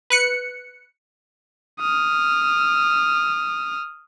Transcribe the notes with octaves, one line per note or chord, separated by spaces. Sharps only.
B4 F#6 C#7
D#6 F6